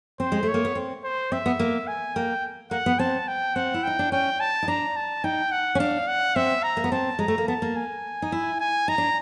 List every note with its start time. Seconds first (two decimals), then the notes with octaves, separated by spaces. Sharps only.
0.19 C4 C5
0.32 G#3
0.43 A3
0.48 C#5
0.54 A#3
0.65 B3
0.75 C4
1.04 C5
1.32 C4 E5
1.46 B3
1.60 A#3
1.87 G#5
2.16 A#3 G5
2.71 A#3 F#5
2.86 B3
2.99 C4 A5
3.28 G5
3.55 C4 F#5
3.74 E4
3.84 D#4 G5
3.99 D4
4.12 C#4 G5
4.40 A5
4.63 D#4
4.68 D4 A#5
4.96 A5
5.24 D#4 G5
5.51 F#5
5.75 C#4
5.79 D4 F5
6.08 F#5
6.36 C4 E5
6.63 A#5
6.77 A#3
6.84 B3
6.92 C4 A5
7.19 G#3 A#5
7.28 A3
7.38 A#3
7.48 B3 A5
7.62 A#3
7.76 G#5
8.22 D#4
8.32 E4
8.60 G#5
8.88 D#4 A#5
8.98 D4